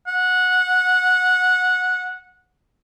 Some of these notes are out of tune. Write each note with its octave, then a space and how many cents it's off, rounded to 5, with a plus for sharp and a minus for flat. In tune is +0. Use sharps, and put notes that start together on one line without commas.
F#5 -15